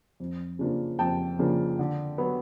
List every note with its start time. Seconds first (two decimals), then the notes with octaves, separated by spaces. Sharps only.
0.20 F2
0.59 C#3 F3 A#3 D4
0.99 F2 G5 A5
1.39 C#3 F3 A#3 D4
1.79 D3
2.18 F#3 B3